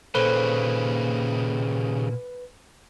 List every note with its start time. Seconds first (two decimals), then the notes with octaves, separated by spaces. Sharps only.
0.15 D#2 A#2 C#3 A4 B4 C5 G7